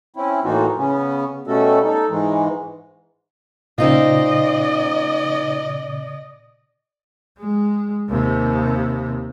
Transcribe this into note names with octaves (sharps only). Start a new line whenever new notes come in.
C4 C#4 E4
A2 E3 A#3 D#4 F4 F#4
C#3 B3 C#4
B2 G3 A3 C#4 F#4 A4
D#4 A4
G#2 D#3 E3 G#3
A#2 C#3 C4 D#4 F4 D5 D#5
G#3
D#2 C3